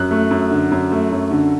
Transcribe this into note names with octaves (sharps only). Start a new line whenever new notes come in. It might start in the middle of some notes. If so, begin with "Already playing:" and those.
Already playing: F#2 F#6
A3
F#2
D3
F#2
A3
F#2
D3